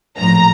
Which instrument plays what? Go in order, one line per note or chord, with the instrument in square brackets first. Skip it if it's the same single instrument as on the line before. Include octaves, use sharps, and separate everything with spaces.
[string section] A#1 A2 F3 A#5